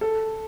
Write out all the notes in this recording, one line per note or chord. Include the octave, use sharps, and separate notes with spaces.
A4